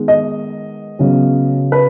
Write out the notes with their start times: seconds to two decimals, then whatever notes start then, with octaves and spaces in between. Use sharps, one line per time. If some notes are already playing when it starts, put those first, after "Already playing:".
Already playing: D#3 G#3 B3
0.08 D#5
0.99 C#3 F#3 B3
1.72 B4